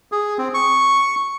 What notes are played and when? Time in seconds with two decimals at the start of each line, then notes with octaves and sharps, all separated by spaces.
0.12 G#4
0.38 C4
0.54 C#6